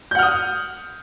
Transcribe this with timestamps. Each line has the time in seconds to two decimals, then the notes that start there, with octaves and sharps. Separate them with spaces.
0.11 G6
0.15 F#5
0.19 F6
0.23 D#6